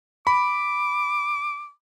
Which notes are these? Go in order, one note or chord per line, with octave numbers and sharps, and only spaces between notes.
B5 D6